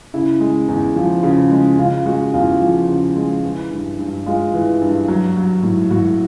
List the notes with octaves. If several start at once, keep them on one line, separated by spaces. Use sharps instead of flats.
C#3 E4
G#3
E2
F3
C#3
G#3
C#3 F4
G#3 F#4
E2 F4
F3 F4
C#3
G#3
E3
G2
G2
G#3 F4
E3
G2
F#3
F#3
A2
A2 F#4